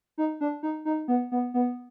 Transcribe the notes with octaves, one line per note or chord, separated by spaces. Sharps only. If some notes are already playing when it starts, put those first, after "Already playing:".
D#4
D4
D#4
D#4
B3
B3
B3